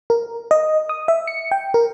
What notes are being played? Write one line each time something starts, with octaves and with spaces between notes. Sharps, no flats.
A#4
D#5
D#6
E5
C#7
G5
A#4